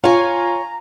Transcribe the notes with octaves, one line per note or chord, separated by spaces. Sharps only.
F4 C#5 G#5 A#5